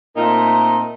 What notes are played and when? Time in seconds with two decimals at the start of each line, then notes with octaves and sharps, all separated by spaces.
0.17 A#2 A3 C4 D#4 F4 A#4